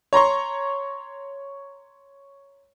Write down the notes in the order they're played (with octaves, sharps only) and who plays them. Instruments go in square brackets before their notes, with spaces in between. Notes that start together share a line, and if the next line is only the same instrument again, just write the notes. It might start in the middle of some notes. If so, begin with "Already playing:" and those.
[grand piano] C#5 A#5 C6 C#6